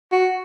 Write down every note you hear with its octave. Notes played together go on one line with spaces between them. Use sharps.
F#4